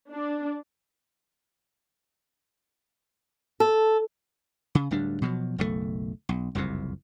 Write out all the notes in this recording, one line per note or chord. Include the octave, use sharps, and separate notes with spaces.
D4
A4
C#3
D1 D2 G3 D4
B2 F3 F#3
F#1 B1 A2 A3
B1
F#1 C2 F2 C3